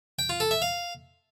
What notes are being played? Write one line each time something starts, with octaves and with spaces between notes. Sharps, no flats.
G5
F4
A4
E5
F5